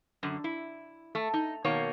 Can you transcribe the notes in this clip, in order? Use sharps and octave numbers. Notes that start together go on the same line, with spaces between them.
F#2 D3
E4
A3
D#4
B2 D#3 A#3 C#5